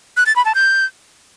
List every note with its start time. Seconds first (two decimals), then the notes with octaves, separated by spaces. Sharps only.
0.17 F#6
0.26 A6
0.36 B5
0.45 A5
0.55 G6